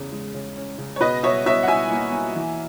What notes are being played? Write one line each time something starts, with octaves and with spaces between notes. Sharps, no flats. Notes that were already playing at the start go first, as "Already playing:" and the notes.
Already playing: E2 C#3
G#3
C#3
C#4
C#3
C#5
B2 B4 D#5
B2 C#5 E5
B2 C#5 E5
F#5
B2 E5 G#5
A#3
A#3
E3